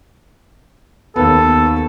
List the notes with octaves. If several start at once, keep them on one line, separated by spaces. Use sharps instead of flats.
D#2 B3 A4